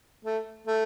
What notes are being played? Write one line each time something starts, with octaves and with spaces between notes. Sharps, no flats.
A3
A3